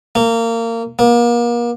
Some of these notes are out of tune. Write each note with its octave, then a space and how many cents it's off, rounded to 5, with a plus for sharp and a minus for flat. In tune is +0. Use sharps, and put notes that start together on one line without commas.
A#3 -25
A#3 +35